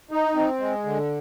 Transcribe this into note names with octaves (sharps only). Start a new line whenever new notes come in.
D#4
C4
G#3
D3